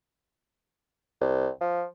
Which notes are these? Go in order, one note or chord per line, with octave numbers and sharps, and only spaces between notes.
C2
F3